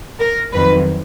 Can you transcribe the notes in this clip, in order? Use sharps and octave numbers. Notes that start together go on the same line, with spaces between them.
A#4
F2 D#3 F#3 B4